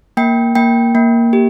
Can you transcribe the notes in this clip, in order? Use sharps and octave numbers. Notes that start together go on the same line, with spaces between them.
A#3 G5
A#3 G5
A#3
G4